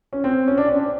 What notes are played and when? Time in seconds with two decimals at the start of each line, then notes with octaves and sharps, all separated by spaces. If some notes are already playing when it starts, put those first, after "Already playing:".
0.13 C#4
0.24 C4
0.48 C#4
0.58 D4
0.69 C#4
0.80 D4